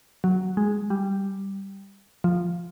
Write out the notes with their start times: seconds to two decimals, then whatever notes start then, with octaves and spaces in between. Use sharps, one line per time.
0.24 F#3
0.57 G#3
0.90 G3
2.24 F3